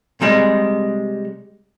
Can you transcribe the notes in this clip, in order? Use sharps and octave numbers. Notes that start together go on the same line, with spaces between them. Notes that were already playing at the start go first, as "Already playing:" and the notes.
C3 G3 G#3